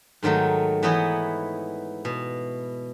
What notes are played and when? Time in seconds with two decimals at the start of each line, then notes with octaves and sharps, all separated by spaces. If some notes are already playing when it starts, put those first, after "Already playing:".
0.23 G#2 D#3 F#3 A3 D#4
0.83 E3 B3 D#4 E4 C#5 D#5
2.05 B2